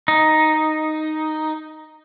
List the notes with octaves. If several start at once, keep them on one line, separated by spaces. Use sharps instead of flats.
D#4